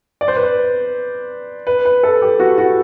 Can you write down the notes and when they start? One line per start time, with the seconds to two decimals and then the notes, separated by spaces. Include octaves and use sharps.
0.21 D5
0.28 C5
0.36 B4
0.43 C5
1.67 B4
1.85 B4
2.03 A4
2.22 G4
2.40 F#4
2.58 F#4